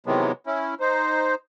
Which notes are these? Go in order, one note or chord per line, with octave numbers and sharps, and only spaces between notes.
C3 D#3 E3 F#3 G#3 B3
C#4 E4
D#4 C5